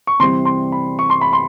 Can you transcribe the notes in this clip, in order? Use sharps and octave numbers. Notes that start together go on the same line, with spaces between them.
C#6
C3 E3 G3 C4 C6
C6
B5
C#6
C6
B5
C6